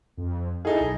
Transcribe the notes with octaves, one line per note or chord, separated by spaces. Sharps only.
F2
D#4 E4 G#4 A4
B1